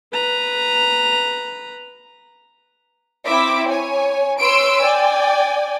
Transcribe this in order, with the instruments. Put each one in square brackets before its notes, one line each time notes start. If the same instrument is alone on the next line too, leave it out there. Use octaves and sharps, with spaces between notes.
[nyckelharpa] B4 A#5
[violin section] C4 E4 E5 D6
C#5 G#5
B4 C#5 C6 E6 D7
D5 G5 G#5